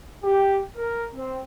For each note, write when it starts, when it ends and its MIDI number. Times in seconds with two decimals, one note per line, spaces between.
0.24 0.58 67
0.76 1.06 70
1.14 1.39 60